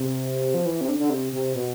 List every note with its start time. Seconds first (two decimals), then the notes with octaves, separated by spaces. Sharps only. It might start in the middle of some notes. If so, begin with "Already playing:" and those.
Already playing: C3
0.54 F3
0.66 E3
0.81 C3
0.89 D3
0.99 D3
1.10 C3
1.33 C3
1.55 B2